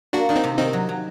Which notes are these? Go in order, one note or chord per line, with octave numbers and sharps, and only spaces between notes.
A#3 D4 F#4
D#3 D4
C4 D#4
C3
D#3 C4 D#4
F#3
F#3